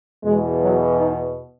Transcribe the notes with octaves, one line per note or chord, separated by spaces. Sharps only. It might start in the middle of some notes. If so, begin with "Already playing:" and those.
E2 B2 G#3
F#3
D#4